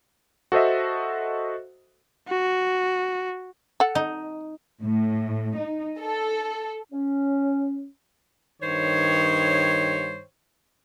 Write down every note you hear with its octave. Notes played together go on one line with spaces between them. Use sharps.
F#4 A4 C5 D#5 E5
F#4
A4 F#5
D#4
A2
D#4
A4
C#4
G2 D#3 C5 C#5